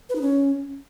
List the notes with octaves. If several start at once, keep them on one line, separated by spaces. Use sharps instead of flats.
B4
D#4
C#4